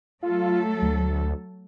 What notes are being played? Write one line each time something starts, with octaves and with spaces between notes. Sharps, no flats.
F#3 A3 F4 A4
D2